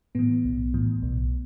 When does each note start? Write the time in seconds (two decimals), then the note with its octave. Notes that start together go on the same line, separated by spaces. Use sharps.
0.15 A2 E3 B3
0.45 B1
0.74 A2 E3
1.02 B1